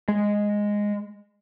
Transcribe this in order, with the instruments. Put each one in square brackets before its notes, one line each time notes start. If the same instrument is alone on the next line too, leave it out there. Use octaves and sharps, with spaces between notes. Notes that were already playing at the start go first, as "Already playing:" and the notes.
[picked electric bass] G#3